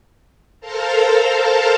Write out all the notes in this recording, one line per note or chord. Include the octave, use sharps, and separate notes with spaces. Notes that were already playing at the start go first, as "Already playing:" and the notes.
A4 A#4 C5 F5 A5 A#5